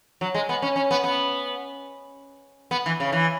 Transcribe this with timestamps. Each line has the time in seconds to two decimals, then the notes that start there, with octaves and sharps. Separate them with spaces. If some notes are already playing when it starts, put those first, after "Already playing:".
0.21 F#3
0.35 G#3
0.49 B3
0.62 C#4
0.76 C#4
0.91 B3
1.04 B3
2.71 B3
2.86 E3
3.00 C#3
3.12 E3